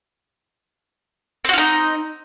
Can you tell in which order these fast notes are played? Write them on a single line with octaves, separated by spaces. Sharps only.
C4 F#4 F4 D#4